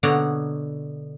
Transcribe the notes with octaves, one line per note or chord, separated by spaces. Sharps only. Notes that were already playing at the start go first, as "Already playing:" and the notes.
B2 D3 B3 C#5 D5 A#5